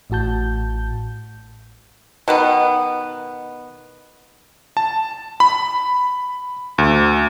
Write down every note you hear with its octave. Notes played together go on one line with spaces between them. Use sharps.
A1 A2 F#4 A5 G6
B2 D#3 B3
A5
B5
D2